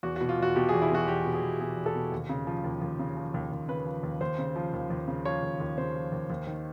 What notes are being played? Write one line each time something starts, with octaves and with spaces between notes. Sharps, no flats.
E2 F#4
F#4
B2
F4
E2 F#4
B2 G4
G#4
E2
E4
B2 F#4
E2 G4
B2
G#4
E2
B2 G#4
E2
A4
B2
D#2
C#3
F3
D#2
D#2
C#3
F3
D#2
D#2
C#3 B4
F3
D#2
D#2 C5
C#3
F3
D#2
D#2
C#3
F3 C#5
D#2
D#2
C#3 C5
F3
D#2
D#2
D#3